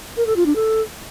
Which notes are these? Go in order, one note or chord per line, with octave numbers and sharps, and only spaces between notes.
A#4
A4
F4
D4
A4